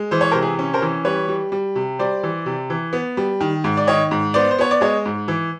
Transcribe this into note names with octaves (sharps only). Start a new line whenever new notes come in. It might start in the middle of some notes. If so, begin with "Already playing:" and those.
Already playing: G#3
E3 C5
C#5
A#4 C5
C3
G#4
C#4
A#4 C5
E3
G3 B4 C#5
G3
G3
C3
G3 C5 D5
E3
C3
E3
B3
G3
D#3
G#2
D5
D#3 C#5 D#5
G#2
B3 C5 D5
C5
B3 C#5
D5
G#3 C#5 D#5
G#2
E3